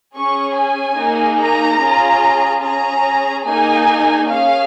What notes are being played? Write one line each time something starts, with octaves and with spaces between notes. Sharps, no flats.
C#4 G#4 C#6
G#5
A#3 D#4 G#4
A#5
C#4 F4 G#4
C#4 G#4 A#5
A#3 D#4 G#4 G#5
C#4 G#4 F5